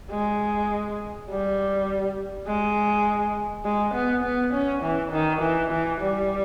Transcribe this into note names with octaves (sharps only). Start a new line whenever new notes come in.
G#3
G3
G#3
G#3
B3
B3
C#4
E3
D#3
E3
E3
G3